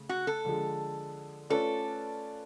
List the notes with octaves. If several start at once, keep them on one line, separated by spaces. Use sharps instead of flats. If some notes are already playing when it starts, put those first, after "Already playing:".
Already playing: C#3 A3
F#4
A4
D3 F3 G#3
A3 C#4 F4 A4 B4 D5